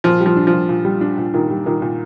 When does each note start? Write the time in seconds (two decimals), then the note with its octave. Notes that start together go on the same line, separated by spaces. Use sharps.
0.04 A#2 F3
0.20 G3
0.26 F3
0.36 D4
0.47 F3
0.53 A#2
0.69 A#2
0.85 G3
1.01 D4
1.18 A#2
1.34 A#2 D#3
1.50 G3
1.66 A#2 D#3
1.82 A#2